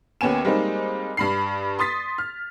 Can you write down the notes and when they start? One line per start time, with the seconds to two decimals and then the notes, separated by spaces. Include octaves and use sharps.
0.21 D#2 B3 C#4 G#5 E7
0.45 G3 G#3 A#3 C4 D#4
1.17 G2 B5 C7
1.79 C6 D#6 A6 B6
2.18 F6